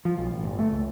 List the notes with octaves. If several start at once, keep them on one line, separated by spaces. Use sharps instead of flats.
F3
B1
A1
G1
A3
C#2